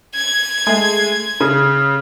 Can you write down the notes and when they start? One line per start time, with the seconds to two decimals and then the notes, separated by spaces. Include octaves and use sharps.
0.15 G#6
0.66 G#3 A3 G#4
1.40 C#3